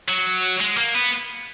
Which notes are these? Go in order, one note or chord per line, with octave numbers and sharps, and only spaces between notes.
F#3
G#3
A#3
B3